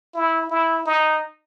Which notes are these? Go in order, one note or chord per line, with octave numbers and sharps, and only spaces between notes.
E4
E4
D#4